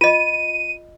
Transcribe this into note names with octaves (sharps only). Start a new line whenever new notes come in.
F4 D#5 D#7